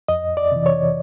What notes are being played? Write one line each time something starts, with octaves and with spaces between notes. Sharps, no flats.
F2 D#5
D5
C3 E3
C#5